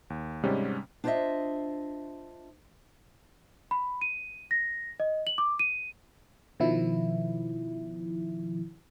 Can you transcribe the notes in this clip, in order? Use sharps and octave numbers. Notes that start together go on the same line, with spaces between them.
D#2
G#2 C3 G3 G#3 C#4
D4 F4 C5 C#5 D#5 E5
B5
D#7
A#6
D#5
F#7
D6
D#7
B2 D#3 F3 E4